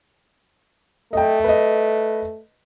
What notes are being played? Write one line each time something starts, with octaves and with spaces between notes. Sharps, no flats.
A3 D#5 G5
B4 D#5